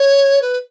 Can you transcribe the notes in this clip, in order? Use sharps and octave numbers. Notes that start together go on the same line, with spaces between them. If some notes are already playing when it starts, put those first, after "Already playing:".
Already playing: C#5
B4